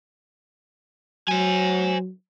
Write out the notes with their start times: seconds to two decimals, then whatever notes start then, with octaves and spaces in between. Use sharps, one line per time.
1.28 F#3 C5 G#5